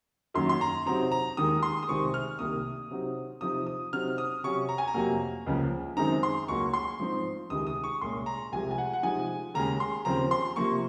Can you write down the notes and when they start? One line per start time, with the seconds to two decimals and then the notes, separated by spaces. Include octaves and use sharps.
0.34 F#2 D#3 F#3 A#3 C6
0.49 C6
0.61 A#5
0.86 C3 F#3 C4 D#4 A#5
1.12 A#5
1.37 D#2 D#3 G#3 D#6
1.63 C6
1.83 D#6
1.89 C2 C3 D#3 G#3 C4 C#6
2.14 F6
2.39 C2 C3 D#3 A#3 D#6
2.90 C3 F#3 C4 D#4
3.41 C3 F3 C4 D#4 D#6
3.66 D#6
3.92 C3 F#3 C4 D#4 F6
4.18 D#6
4.44 C3 F#3 C#4 C#6
4.69 A#5
4.78 G#5
4.88 A#5
4.94 F2 C3 F#3 A#3
5.46 C#2 C#3 F3 A#3
5.97 F#2 D#3 G#3 C4 D#4 A#5
6.23 C6
6.48 C#2 C#3 F#3 A#3 C#6
6.73 C6
6.99 G#2 F3 C4 D#4
7.50 C#2 C3 D#3 G#3 D#6
7.67 D#6
7.84 C#6
8.01 C2 A#2 G#3 C#4 C6
8.26 A#5
8.52 C2 C3 F3 G#3 G#5
8.71 G#5
8.78 F#5
8.93 F#5
9.03 C3 F3 G#3 D#4 G#5
9.54 D#2 C#3 G#3 A#5
9.80 C6
10.05 D#2 C#3 F3 C4 A#5
10.31 C6
10.56 C3 F3 A#3 C#6